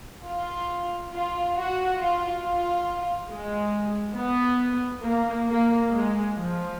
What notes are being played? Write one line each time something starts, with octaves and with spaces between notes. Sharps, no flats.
F4
F4
F#4
F4
F4
G#3
B3
A#3
A#3
G#3
F3